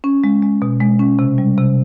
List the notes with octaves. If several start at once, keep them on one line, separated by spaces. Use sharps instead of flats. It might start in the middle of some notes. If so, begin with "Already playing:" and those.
C#4
G#3
G#3
B2
G#3
C#4
C3
G3
C3